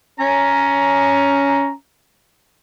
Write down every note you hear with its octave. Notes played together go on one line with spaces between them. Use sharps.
C#4 A#5